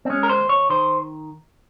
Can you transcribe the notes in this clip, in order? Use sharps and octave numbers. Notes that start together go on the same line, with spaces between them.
C4
G#3 C#4
A#4
C5
D#2
C#5
D#3 C5